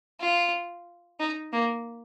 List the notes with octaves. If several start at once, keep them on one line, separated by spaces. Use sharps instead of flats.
F4
D#4
A#3